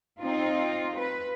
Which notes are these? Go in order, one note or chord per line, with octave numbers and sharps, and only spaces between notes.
C4 D#4 F4
B4